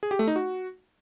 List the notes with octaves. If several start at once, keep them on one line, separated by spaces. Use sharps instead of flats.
G#4
G4
A3
D#4
F#4